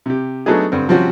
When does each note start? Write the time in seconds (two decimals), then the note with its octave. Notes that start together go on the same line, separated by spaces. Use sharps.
0.06 C3 G4
0.46 F#3 A3 B3 D4 D#4 G#4
0.72 G2 D3 C4
0.88 C3 F3 G3 C4 C#4 F#4